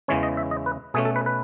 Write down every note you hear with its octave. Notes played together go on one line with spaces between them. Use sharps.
E2 C#3 E3 G#3 C#4 C#5
D#5
E5
D#5
B4
B2 A3 C#4 G#4
A4
B4
B4